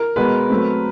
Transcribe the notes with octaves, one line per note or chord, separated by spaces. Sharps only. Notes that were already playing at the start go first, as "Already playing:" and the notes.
Already playing: A#4
B2 G#3 B3 B4
F#3 A3 C4